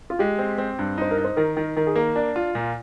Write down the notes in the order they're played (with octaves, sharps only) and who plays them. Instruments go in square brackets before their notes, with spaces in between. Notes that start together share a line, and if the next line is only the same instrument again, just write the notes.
[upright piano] F4
[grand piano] G#3 [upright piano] G4
[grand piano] C4
C4
G2
[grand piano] D#4 [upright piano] C5
[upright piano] A#4
[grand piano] D#4
[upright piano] C5
[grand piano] D#3 [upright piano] A#4
[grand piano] D#3
[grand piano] D#3 [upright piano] A#4
[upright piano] G#4
[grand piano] A#3 [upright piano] A#4
[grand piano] D4
F4
A#2